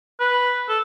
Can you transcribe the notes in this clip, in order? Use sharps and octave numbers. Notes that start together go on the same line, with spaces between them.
B4
A4